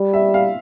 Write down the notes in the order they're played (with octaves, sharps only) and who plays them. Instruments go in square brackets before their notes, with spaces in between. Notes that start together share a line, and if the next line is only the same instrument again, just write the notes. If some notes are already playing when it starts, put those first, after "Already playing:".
Already playing: [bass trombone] G3
[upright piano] E5
F5